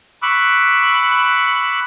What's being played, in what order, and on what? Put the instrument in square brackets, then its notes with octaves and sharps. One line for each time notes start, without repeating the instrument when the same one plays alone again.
[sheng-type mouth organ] B5 C#6 D6 E6 F#6